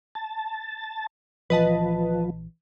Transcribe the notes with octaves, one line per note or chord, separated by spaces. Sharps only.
A5
A#1 E3 F3 B4 D#5 A5